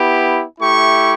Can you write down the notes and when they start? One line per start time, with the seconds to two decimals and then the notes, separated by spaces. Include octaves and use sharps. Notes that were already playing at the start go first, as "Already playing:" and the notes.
Already playing: B3 E4 G4
0.60 A3 E4 G4 C#6